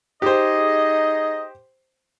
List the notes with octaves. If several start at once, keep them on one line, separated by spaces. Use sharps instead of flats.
D#4 G4 G#4 C5 D#5